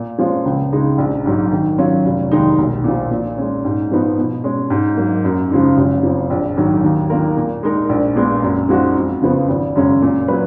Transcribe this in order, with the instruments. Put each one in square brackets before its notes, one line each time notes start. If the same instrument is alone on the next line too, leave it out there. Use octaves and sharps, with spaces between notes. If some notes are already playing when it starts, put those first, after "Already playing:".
Already playing: [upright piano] A#2
F3 G#3 C#4 F4
C#2
C#3 G#3 D#4 G#4
A#1
G#2 F#3
D#3
F#3 C#4 F4
F1
D#2 D#3 G#3 D#4
B1
A#2 F3
A#2
G#3 C#4
G#2
F3 B3 D#4
B2
G#3 C#4
G#2
F#3 A#3 D#4
F#2
C#3 F3 G#3 D#4
F#1
F2 F3
A#1
G#2 D#3 F#3
D#2
D#3 A#3 F4 A#4
A#2
G#3 D#4 A#4
A#1
A#2 G#3 B3
F#2
F3 G#3 D#4 F#4
F2
C#3 F3 B3
G#1
F#2 C#3 G#3 C#4
A#2
F#3 C#4 F4 B4